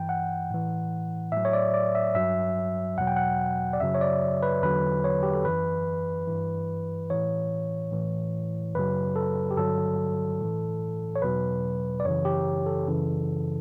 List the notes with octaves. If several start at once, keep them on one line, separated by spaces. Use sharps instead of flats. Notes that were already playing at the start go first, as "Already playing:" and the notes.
Already playing: G2 E3 G5
F#5
A2 E3
A2 F#3 E5
C#5
D5
D5
E5
G2 F#3 E5
E2 B2 F#3 F#5
G5
F#5
D5
F#2 C#3 F#3 E5
C#5
D5
B4
E2 D3 F#3 B4
C#5
G4
A4
F#2 E3 B4
G2 E3
A2 E3 C#5
A2 E3
F#2 C#3 F#3 B4
A4
G4
G2 D3 F#3 A4
A2 E3
C#5
E2 B2 F#3 B4
D5
F#2 C#3 E3 C#5
G4
A4
F#2 C#3 E3